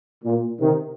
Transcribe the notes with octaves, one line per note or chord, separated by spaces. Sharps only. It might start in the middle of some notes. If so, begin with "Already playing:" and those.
A#2
C3 D#3